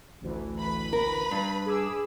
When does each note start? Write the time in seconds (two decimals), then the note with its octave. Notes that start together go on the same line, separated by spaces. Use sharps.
0.21 A1 D2 E3
0.61 B4 B5
0.93 A#4
1.31 G2
1.66 G#4 D6 E6